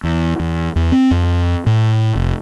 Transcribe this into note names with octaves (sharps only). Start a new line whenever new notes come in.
E2
E2
E2
C4
F2
A2
F1